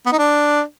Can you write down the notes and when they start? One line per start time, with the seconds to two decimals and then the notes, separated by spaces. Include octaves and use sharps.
0.06 B3
0.12 D#4
0.19 D4